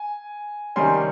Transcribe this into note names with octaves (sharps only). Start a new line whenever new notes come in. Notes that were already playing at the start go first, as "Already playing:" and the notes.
Already playing: G#5
C3 D#3 G3 C#4 G#5 C6